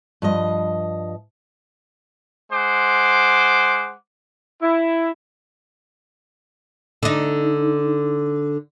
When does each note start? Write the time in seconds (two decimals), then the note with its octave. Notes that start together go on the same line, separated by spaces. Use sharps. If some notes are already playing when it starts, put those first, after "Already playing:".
0.22 G2 F3 D#5
2.52 G#3 C5 F#5 D6
4.62 E4
7.03 D3 D#4